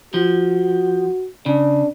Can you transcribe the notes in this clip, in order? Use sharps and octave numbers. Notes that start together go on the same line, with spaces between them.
F3 F#4
C#3 D4